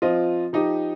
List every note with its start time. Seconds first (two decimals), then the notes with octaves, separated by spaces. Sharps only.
0.02 F3 C4 F4 D#5
0.53 F3 D#4 G4 D#5